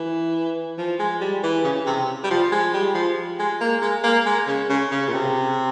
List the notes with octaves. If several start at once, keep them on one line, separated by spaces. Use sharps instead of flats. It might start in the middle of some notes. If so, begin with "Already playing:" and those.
Already playing: E3
F3
G#3
G3
E3
C#3
C3
G3
F3
G#3
G3
F3
G#3
A#3
G#3
A#3
G#3
C#3
C#3
C#3
A#2
C3